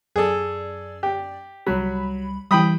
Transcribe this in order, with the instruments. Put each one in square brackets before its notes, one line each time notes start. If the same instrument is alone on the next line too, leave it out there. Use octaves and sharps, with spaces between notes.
[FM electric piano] F#2 D5 [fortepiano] G#4 A4
[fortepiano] G4
[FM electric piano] C2 G3 B5 [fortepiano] F#3
[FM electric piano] E3 G3 [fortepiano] G5 B5 D#6